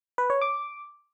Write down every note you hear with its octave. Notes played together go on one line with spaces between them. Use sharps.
B4
C#5
D6